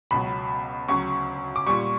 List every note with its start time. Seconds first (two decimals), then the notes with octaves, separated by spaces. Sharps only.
0.11 C#2 B2 F#3 B5
0.88 D2 C#3 F#3 C#6
1.56 D6
1.67 A#2 G3 C#6